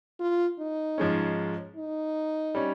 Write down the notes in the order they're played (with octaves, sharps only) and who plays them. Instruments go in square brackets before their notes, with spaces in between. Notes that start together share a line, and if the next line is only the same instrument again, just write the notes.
[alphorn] F4
D#4
[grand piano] G#2 F3 G#3 C#4
[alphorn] D#4
[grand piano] G3 C#4